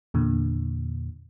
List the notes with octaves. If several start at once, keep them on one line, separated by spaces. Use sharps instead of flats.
E2 A#2 D3